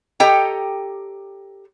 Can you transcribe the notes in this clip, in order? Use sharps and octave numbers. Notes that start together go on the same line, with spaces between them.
G4 A4 C#5 D#5 G5 A#5